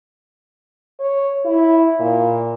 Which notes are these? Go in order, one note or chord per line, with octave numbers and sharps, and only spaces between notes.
C#5
E4
A#2